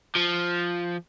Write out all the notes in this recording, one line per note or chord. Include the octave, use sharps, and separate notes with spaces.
F3